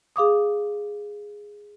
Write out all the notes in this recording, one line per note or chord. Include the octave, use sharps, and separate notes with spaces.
G#4 F5 D6 D#6